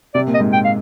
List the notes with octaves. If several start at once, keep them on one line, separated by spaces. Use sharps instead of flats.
C3 D5
A#2
D#5
G#2
G5
F5